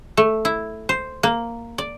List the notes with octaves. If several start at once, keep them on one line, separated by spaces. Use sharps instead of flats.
A3
E4
C5
A#3
D5